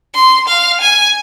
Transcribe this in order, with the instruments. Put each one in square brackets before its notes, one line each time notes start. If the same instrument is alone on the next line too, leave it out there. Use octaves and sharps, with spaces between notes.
[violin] C6
F5
G#5